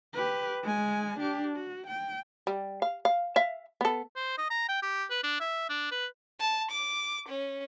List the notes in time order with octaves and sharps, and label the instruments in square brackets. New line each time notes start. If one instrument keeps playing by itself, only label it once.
[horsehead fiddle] G4 B4
G#3 G#5
D4 G4
F#4
G5
[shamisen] G3
F5
F5
E5 F5
B3 A4
[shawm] C5
D#5
A#5
G5
G4
B4
D4
E5
D4
B4
[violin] A5
D6
C#4